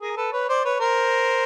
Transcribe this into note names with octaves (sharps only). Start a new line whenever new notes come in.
G#4 A#4
A4 B4
B4 C#5
C5 D5
B4 C#5
A#4 C5